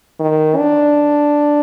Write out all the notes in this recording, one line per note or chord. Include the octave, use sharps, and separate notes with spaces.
D#3
D4